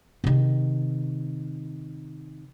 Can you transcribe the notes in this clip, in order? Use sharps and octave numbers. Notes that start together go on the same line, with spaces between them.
C3 D#3